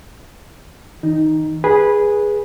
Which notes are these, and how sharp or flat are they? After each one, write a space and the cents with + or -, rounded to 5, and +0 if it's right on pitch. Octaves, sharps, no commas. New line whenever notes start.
D#3 +40 D#4 +0
G#4 -5 B4 -15